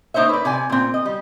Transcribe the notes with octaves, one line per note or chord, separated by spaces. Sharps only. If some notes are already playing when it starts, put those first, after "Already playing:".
A#3 D#4 C5 C#5 E5
B4 D5
C3 D5 G#5
A#2 C4
D#5
G3